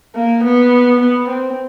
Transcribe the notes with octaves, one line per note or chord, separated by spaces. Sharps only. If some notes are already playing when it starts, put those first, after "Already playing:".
A#3
B3
B3
C4